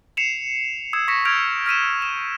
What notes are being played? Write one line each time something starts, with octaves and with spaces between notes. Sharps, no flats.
C7 C#7 E7 F7
D#6 E6 G#6 E7
C#6 A#6 B6 C#7 E7
F6 G6 G#6 D7 F7
F6 B6 D#7 E7
E7